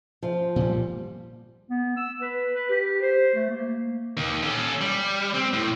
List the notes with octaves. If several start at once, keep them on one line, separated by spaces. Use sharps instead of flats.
F3
A#2 G3
B3
E6
B4
B4
G4
C5
A3
A#3
D#2
C#4 A4
G3
C4
A2